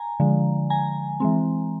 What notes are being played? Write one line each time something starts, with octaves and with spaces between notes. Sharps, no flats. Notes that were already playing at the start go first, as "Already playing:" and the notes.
Already playing: G#5 A#5
D3 F3 G#3
G#5 A#5
E3 G#3 C4